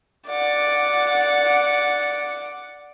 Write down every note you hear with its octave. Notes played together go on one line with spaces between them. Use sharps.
D5 F#5